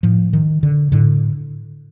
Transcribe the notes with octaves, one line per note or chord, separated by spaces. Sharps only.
A2 F3
D#3
D3
A2 D3